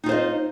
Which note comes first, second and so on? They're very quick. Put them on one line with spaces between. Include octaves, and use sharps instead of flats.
D#4 F4 C5 D#5